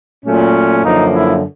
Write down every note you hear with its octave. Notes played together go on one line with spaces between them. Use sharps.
A#2 F#3 A3 C#4
F#2 D3 F3 A#3 D#4
E4